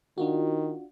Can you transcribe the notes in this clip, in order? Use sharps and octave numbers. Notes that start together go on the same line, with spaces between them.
D#3 D4 F4 F#4